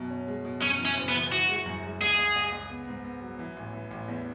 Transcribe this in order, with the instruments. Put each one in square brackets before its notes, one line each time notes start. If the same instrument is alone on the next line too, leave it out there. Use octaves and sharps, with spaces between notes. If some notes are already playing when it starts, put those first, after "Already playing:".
Already playing: [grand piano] F#2 B2
C#4
G#3
B2
[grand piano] F#2 [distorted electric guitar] C#4
[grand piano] E3
[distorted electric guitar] C#4
[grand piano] F#1
[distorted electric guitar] B3
[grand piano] E3
[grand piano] E3 [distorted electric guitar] F#4
[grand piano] G#3
F#2
G#3
[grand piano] C#2 [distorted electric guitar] G#4
[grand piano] C#2
C#2
C#2
B3
G#2
B3
F#3
E3
A1
E3
A1
E2